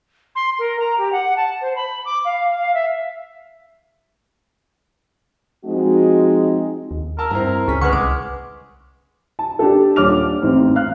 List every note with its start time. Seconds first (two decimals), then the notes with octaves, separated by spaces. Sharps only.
0.35 C6
0.59 A#4
0.80 A#5
0.98 G4
1.12 F#5
1.37 A5
1.61 C5
1.76 B5
2.05 D6
2.25 F5
2.50 F5
2.74 E5
5.65 F3 G#3 C4 D#4 F#4
6.91 D#2
7.19 A#4 A5 E6
7.31 G2 C4 E4 A#5
7.68 C#2 C#4 B6
7.81 D3 G#3 B4 F#5 C#6 F6
7.93 C2 D6
9.39 A5
9.59 D4 G4 A4
9.96 D#1 D4 C#5 D6 F6 F7
10.42 A1 C4 D#4
10.76 F5 F6 F#6